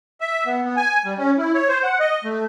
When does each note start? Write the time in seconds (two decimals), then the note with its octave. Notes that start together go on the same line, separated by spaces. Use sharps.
0.21 E5
0.46 B3
0.64 B3
0.77 G#5
1.05 G3
1.18 C#4
1.38 E4
1.54 C#5
1.68 C5
1.83 F#5
2.00 D#5
2.24 A3